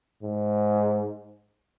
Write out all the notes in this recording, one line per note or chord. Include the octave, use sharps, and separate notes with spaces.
G#2